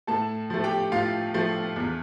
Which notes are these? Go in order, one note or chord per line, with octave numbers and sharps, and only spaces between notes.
A2 A4 A5
F3 A3
G4 G5
A2 F4 F5
F3 A3
E2